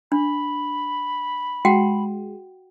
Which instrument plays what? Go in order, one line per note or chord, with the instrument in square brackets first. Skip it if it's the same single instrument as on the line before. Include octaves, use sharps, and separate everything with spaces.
[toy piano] D4 [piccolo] B5
[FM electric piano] G#3 [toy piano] F#4 F#5 G5